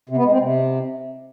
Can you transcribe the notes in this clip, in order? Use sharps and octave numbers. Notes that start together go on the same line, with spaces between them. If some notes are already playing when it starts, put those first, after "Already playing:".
C3
B3
G#3
C4
C3